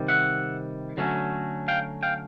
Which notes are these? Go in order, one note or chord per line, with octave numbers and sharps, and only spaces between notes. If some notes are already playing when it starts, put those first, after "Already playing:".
Already playing: C3 D#3 G3
E5 F#5
D3 F#3 A3 C#4
F5 G5
F5 G5